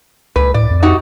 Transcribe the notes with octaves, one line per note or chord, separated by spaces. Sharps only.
C#2 A#2 B4
A2 D5
F2
D#4 F#4 G4